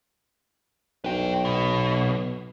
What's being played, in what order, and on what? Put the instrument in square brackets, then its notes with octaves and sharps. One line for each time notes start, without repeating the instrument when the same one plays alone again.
[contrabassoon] B1 [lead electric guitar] B4 G5
[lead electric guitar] B2